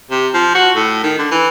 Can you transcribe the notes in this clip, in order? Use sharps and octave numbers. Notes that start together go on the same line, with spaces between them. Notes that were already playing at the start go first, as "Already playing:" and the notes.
C3
F3
F#4
A2
D#3
D3
E3